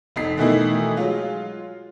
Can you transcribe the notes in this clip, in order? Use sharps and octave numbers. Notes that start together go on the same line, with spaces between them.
F1 D#4 B6 C7
B2 D#3 E3 A3 D#4 E4
F#3 G#3 F4